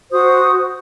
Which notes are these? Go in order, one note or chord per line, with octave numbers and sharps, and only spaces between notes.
F#4 C5 D#6